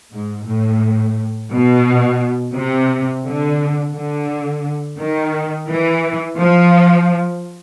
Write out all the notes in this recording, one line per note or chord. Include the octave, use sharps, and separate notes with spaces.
G#2
A2
B2
C3
D3
D3
D#3
E3
F3